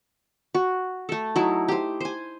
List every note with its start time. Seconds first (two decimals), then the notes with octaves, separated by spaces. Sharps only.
0.55 F#4
1.09 A3 A4
1.36 F#3 D#4 E4
1.68 G4 C5
2.01 C5 G#5